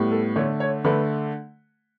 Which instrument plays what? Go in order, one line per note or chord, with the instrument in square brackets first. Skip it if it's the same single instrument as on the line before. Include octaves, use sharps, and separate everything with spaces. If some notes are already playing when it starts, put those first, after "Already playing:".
Already playing: [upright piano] A2 G3 B3
A4
D3 A3 C#5
C#5
D3 A3 B4